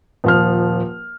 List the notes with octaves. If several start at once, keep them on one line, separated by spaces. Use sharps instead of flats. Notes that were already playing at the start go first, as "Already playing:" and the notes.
D#1 F3 F6